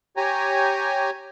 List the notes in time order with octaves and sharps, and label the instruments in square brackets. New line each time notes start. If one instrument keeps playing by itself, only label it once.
[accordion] G4 C#5 G5 G#5 A#5